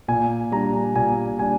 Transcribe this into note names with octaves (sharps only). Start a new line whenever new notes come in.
A#2 G#5
G3 D4 A#5
A#2 G#5
G3 D4 G#5